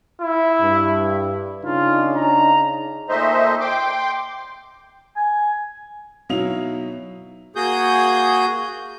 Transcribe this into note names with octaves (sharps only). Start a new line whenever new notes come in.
E4
G2
C#3 D4 D#4 F4
A#5
A#2 A3 D#4 C5 D#5 E5
G5 C6 D6
G#5
B2 F#3 D#4 E4 F5 F7
A#3 F#4 G#4 D#6 G6